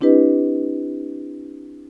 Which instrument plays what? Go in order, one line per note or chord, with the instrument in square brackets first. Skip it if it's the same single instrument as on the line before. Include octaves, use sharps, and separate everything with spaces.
[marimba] C4 D4 E4 G4 B4 D#5